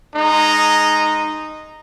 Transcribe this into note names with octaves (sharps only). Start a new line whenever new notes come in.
G#3 D#4